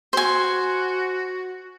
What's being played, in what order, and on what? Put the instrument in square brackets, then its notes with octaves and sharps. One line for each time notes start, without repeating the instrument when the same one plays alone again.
[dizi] F#4 [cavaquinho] C5 G#5